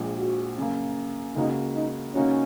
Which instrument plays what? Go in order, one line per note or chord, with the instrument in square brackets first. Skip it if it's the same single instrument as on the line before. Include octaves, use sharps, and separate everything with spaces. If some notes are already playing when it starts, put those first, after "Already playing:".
Already playing: [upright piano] A#1 A#2 G#3
[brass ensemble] F#4
[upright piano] F#2 C#3 A#3
[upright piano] C#2 C#3 A#3 F#4 [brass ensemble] D#4
[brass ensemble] D#4
[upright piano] C#2 C#3 A#3 D#4 F#4 [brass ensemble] C#4